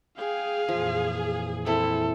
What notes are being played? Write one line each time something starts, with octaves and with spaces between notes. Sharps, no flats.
G#4 F5 G5
F2 A#2 E3 F3
C4 E4 A4